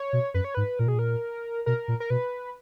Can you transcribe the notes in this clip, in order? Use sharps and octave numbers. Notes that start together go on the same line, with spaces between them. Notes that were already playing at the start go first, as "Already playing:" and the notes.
Already playing: C#5
B2
F#2 B4
C#5
G#2 B4
A#2 A#4
B2 G#4
A#2 A#4
B2 A#4
A#2
A#4
B2 B4